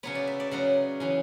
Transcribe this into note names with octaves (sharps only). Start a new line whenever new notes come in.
C#3 F#3 B3 C#5
D5
E5
D5
C#3 F#3 B3 F#5
C#3 E3 B3